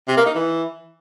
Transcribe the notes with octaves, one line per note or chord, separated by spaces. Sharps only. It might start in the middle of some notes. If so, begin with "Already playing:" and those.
C3
A#3
D#4
E3